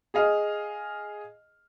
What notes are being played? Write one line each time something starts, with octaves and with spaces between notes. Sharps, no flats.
G#4 D#5 F5